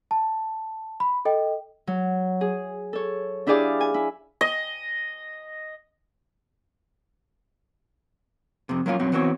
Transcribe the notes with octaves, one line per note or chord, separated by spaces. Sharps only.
A5
B5
A4 D#5 G5
F#3
G#4
A4 C#5
D4 E4 G4 G#4 D5 F5
G#5
E4
D#5
F2 C3
F#3 A#3 C#4 F4
B1 F#2 C4 C#4 F#4
E3 B3 C4 F#4 B4 C#5